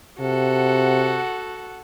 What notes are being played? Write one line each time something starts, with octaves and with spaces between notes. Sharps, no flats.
C3 F#4 A4 F#5